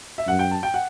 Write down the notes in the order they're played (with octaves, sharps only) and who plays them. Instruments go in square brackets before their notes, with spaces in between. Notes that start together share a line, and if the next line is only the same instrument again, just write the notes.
[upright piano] E5
[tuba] F#2 [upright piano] F#5
[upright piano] G5
A5
G5
F#5